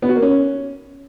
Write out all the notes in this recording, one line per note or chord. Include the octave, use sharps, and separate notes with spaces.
B3
F#4
A#3
C#4